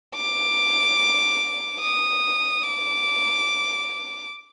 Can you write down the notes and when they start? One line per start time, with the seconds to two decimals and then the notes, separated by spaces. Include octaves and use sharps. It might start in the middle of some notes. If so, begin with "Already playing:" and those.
0.16 D6
1.80 D#6
2.63 D6